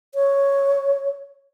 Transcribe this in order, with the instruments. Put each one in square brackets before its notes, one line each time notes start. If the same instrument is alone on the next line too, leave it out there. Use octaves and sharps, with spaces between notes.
[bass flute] C#5